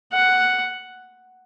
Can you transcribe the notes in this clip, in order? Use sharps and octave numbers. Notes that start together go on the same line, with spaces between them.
F#5